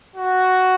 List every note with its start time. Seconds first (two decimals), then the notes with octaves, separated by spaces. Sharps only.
0.16 F#4